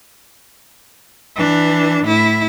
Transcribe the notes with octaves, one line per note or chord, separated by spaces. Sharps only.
E3 D4
A2 E4